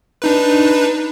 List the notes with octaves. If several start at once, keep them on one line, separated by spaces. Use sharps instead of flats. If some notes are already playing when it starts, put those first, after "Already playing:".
D4 D#4 B4